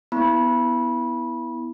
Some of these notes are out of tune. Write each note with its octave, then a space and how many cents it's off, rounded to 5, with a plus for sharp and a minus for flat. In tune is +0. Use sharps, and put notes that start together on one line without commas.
B3 +0 E4 -10 B5 -25